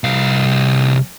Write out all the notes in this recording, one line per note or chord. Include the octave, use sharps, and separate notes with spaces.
C2 F5